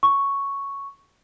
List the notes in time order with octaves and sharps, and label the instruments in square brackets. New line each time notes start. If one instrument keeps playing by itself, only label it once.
[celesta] C#6